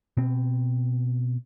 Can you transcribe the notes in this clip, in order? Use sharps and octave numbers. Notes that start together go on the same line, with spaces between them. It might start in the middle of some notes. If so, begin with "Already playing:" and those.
B2 C4